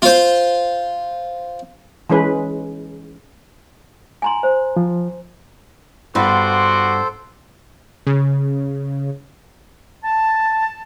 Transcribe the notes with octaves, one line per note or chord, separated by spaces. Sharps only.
F4 C5
E3 G#3 C#4 B4
G#5 A#5 C6
C5
F3
G2 B3 F#4 A4 B4 C5 C6 D6
C#3
A5